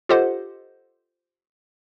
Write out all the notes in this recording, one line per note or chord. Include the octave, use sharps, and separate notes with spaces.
F4 G4 A4 C5 D#5 F#5